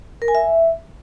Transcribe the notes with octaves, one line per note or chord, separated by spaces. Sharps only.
A#4
G#5
E5